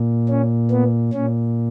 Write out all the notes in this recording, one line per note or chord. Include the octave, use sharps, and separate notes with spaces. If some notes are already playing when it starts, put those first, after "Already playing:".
Already playing: A#2
C#4
B3
A#2 C#4